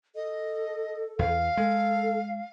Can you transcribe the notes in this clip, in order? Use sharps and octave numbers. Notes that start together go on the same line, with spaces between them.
A4 D#5
E2 F5
G#3 A4